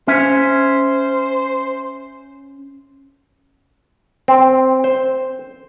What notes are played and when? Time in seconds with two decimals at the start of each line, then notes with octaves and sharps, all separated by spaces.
0.08 C#4 C5 E5
4.28 C4
4.84 C5